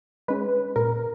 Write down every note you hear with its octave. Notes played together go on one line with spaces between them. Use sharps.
G#3 C#4 B4
A#2 A#4